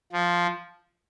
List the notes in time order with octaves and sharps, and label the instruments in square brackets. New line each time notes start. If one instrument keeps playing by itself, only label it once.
[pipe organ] F3